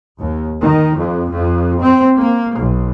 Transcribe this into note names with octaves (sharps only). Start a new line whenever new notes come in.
D#2
D#3
F2
F2
C4
A#3
B1